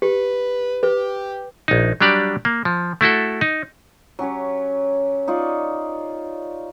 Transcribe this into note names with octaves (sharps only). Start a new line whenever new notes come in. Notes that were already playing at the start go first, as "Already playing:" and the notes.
G4 B4
G4 B4
A#1 D#4
F#3 G3 D4 G4 D5
A#3
F3
A3 E4 F#4 A4
D#4
F#3 C#4 G4 C#5
D#4 F4 C#5 D5